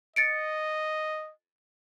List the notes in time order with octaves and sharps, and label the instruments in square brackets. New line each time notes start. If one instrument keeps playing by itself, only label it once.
[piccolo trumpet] D#5 [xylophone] A6 C#7 D7